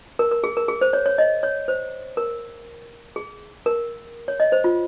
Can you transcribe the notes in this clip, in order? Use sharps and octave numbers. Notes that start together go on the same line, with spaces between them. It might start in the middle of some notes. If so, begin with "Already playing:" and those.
A#4
A#4
G#4
A#4
G#4
C5
C#5
C#5
D#5
C#5
C5
A#4
G#4
A#4
C#5
D#5
C5
F4